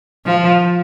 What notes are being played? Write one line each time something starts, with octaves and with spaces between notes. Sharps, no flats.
F3